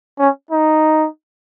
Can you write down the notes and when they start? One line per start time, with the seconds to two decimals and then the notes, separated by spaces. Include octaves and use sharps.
0.19 C#4
0.51 D#4